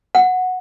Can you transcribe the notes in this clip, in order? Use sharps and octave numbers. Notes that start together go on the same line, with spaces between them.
F#5